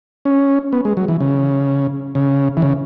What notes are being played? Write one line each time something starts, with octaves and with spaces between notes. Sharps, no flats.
C#4
B3
G#3
F#3
E3
C#3
C#3
E3
C#3